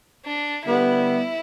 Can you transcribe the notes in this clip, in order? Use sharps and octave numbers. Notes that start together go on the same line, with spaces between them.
D4
D3 G3 B3 E4